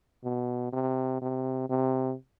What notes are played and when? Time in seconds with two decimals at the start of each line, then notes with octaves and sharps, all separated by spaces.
0.24 B2
0.73 C3
1.21 C3
1.69 C3